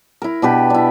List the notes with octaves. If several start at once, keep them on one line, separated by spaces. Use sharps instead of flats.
E4 A#4
B2 D4 G4 B4
D4 E4